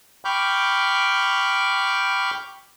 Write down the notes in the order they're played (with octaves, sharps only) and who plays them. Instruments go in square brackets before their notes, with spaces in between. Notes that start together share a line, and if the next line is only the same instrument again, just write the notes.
[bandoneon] G5 B5 C#6 D6 F6 G6